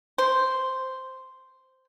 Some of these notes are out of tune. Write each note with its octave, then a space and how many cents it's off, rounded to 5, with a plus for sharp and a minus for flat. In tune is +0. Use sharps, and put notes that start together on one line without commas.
C5 -5